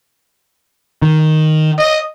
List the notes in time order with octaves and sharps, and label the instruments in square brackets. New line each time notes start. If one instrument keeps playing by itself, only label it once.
[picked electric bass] D#3
[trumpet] D#5